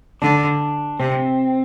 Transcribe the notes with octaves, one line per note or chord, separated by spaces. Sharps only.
D3 D4
C3 C4